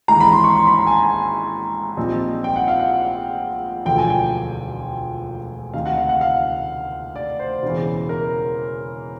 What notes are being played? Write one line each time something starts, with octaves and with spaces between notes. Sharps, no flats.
G#1 G#2 E3 A#5
B5
C6
C#6
C6
B5
A#5
G#5
A5
G#5
A#1 A#2 G3 C4 D#4
G5
F#5
F5
F#5
E1 D2 D3 F3 G5
G#5
G5
D2 C3 D#3 F5
F#5
F5
F#5
F5
D5
C5
E1 E2 C#3 E3
A#4